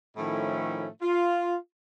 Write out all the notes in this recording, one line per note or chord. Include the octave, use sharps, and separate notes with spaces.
A2 D#3 F3 A3 C#4 E4
F4